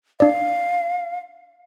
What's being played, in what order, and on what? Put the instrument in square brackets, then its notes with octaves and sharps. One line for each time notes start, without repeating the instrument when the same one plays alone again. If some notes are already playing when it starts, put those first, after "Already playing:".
[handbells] D4 D5 [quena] F5